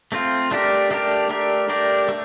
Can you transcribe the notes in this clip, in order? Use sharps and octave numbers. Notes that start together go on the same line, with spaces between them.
A3 C4 F4
A3 D4 G4 A#4
A3 D4 G4 A#4
A3 D4 G4 A#4
A3 D4 G4 A#4
A3